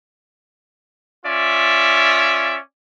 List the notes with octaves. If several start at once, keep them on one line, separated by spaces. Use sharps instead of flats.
C#4 F4 D5 E5